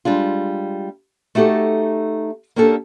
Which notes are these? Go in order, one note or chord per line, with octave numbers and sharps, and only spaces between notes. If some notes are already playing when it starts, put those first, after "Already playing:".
G3 G#3 D4 F4
A3 D#4 F#4 G4 A4
A#3 C#4 D4 G4 A4